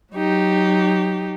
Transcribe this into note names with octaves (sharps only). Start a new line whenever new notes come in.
F#3 D#4 G4